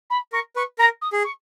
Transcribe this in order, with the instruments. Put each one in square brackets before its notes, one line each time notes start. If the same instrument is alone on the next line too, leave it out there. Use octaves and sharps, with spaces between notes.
[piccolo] B5
[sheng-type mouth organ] A#4 [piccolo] C#6
[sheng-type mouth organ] B4 [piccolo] C#6
[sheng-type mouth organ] A#4 [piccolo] A#5
[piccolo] D#6
[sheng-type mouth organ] G#4
[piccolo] C#6